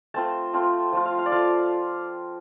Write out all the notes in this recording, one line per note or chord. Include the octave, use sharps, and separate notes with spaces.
A3 C4 F4 A5
A3 C4 F4
F3 A3 F4
F5
F5
D5
F3 A3 F4 F5